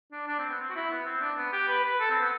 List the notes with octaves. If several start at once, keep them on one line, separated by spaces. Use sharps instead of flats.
D4
D4
C4
B3
C4
F#4
E4
B3
C4
D4
B3
G4
B4
B4
A4
C4
B3